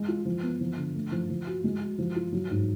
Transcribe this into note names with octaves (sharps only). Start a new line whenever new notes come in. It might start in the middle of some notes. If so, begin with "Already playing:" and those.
Already playing: G#3
F4
F3
B3
F3
D3
A3
F3
F3
F#4
G#3
F#4
F3
F4
F#3
G#2